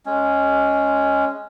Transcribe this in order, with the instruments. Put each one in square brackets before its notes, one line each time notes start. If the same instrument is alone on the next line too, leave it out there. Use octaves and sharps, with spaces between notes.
[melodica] G#3 C#4